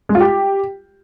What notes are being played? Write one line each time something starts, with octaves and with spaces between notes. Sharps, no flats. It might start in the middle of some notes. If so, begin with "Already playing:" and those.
G#3
F4
G4